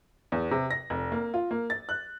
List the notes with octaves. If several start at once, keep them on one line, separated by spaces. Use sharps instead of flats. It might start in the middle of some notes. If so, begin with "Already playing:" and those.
E2
C3
A#6
F1
A#3
F4
A#3
A6
F#6